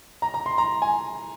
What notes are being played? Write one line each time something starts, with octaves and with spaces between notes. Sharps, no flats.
A#5
A#5
C6
A#5
G#5